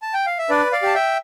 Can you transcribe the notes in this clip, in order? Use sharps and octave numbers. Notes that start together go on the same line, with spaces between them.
A5
G5
F5
E5
D4 B4 D5
D5 F5
G4 A5
E5 G5